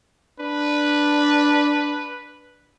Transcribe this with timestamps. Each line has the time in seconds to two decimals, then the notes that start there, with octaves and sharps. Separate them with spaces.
0.39 D4 B4